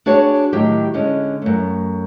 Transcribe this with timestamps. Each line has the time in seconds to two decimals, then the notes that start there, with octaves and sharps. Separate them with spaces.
0.06 D4 F#4 G#4 C#5
0.53 A2 D#3 F#3 G4
0.94 D3 G#3 C#4
1.42 F#2 A3